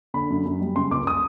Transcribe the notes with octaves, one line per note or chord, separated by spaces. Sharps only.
D3 B5
F#2
F#2
G3
C#3 C6
C#2 D6
D#6